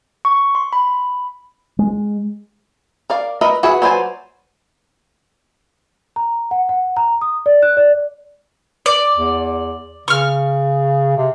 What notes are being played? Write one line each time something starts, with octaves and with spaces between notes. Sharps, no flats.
C#6
C6
B5
G#3
A#4 D5 F5
A#4 B4 D#5 E5 A#5
F#4 G#4 B4 E5 F#5
F#3 B4 C5 D5 G#5
A#5
F#5
F#5
A#5
D#6
D5
F#6
D5
D5
E2
C#3 C#6 F6
C3